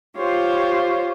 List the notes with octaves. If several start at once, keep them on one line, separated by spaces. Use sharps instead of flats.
F4 G4 C5 C#5